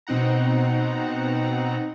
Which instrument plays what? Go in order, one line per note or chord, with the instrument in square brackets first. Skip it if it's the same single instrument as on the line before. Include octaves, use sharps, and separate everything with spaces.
[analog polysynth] B2 C4 D#4 F#5 A#5